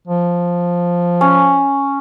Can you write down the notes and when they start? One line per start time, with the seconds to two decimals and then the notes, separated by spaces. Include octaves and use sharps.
0.07 F3
1.21 C#4